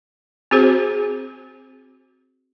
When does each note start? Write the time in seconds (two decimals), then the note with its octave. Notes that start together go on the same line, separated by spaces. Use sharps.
0.51 C4 F#4 G#4 C5